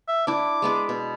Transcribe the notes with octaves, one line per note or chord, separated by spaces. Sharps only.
E5
D4 E4 D6
G#3 B3 B4
B2